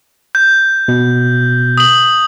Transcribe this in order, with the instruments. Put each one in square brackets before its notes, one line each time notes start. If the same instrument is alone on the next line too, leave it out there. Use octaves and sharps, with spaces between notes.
[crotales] G6
[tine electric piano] B2
[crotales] D#6 F#7